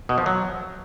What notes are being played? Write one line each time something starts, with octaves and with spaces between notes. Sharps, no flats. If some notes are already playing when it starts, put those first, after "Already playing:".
B2
F3
F#3